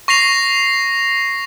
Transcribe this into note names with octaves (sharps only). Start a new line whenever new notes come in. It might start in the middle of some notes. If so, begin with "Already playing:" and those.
C#6 A#6 C7 F7